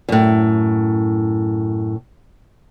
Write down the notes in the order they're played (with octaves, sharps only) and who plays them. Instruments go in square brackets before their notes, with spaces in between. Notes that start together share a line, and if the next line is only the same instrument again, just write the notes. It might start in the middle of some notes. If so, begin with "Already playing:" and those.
[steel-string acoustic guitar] F#2 A2